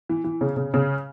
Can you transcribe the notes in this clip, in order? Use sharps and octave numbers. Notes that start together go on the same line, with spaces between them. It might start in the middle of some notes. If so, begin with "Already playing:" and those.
E3
E3
C#3
C#3
C#3